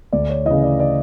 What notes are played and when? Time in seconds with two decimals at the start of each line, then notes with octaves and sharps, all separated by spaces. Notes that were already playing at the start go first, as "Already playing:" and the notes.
0.13 D2 D5
0.29 C#5
0.45 C#3 E3 D#5
0.63 D5
0.80 D5